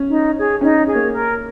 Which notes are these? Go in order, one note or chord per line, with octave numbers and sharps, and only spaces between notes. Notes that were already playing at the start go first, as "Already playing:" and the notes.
Already playing: C#4
D#4
G#4 C#5
C#4 D#4
G#4 C#5
A#3
A#4